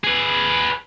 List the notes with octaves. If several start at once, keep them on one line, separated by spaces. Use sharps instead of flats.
G#4 B4